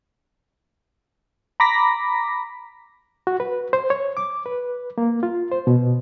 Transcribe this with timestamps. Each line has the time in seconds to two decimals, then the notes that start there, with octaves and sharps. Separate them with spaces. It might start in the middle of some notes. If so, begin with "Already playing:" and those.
1.60 A#5 B5 D6 A#6 B6
3.27 F#4
3.40 B4
3.73 C5
3.90 C#5
4.17 D6
4.46 B4
4.98 A#3
5.23 F4
5.51 C5
5.67 B2